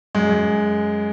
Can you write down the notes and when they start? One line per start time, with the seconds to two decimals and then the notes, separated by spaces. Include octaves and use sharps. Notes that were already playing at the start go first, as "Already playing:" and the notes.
0.15 F#2 G#3
0.30 F#2